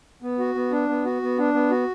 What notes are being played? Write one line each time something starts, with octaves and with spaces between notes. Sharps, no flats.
B3
F#4
B3
D4
B3
F#4
B3
D4
B3
F#4